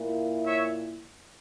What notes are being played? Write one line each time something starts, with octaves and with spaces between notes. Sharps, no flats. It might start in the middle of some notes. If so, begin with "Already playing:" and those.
Already playing: A#2 A#3 E4
C#5 E5